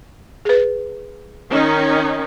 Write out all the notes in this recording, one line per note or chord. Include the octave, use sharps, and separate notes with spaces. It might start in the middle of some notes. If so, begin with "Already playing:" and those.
G#4 B4
D#3 C#4 D#4